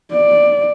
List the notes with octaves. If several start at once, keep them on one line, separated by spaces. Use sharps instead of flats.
D5